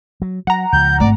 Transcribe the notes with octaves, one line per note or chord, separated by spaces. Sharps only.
F#3
F#3 F#5 A#5
C#2 F3 G6
G#1 A3 D5